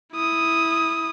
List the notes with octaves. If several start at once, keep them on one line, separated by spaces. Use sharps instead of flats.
E4 D#6